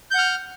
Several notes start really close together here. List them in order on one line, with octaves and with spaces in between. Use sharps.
G6 F#5 F6